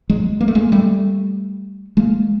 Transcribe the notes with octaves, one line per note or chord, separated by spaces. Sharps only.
F#3 G#3
A#3
A3
G#3 A#3
G3 A3
G#3 A#3